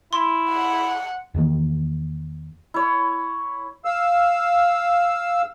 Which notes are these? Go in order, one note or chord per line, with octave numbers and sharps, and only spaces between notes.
E4 C6
F#5
E2 D#3 A#3
E4 C#5
F5 E6